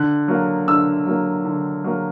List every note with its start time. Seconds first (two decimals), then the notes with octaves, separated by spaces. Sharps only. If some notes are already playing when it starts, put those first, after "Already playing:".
Already playing: D3 F#6
0.28 F#3 A#3
0.68 D3 E6
1.07 F#3 A#3
1.45 D3
1.84 F#3 A#3